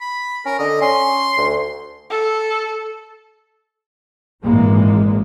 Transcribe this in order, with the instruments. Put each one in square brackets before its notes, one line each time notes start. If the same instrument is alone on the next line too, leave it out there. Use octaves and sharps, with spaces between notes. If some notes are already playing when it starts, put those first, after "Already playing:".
[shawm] B5
[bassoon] C#4 [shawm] A#4
[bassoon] D3 [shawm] D#5
[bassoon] C#4 [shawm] C6
[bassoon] D2
[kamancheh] A4
[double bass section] G#1 A#2 E3 G#3 A#3